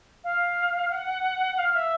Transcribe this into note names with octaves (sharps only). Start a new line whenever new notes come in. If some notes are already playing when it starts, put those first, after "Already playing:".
F5
F#5
F5
E5